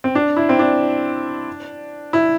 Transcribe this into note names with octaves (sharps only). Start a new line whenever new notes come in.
C4
D4
E4
C4
D4
E4